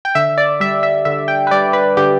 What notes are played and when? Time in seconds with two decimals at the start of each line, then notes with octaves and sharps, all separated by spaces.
0.05 G5
0.15 D3 E5
0.38 D5
0.60 G3 E5
0.83 E5
1.05 D3 E5
1.28 G5
1.47 B4
1.51 G3 D5
1.73 B4
1.97 D3 G4